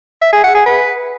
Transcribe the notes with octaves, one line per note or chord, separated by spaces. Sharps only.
E5
G#4
F#5
G#4
B4